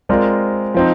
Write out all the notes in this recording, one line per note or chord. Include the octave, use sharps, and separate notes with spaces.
G#3 C4 F4 A#4 D5
F3 C4 D#4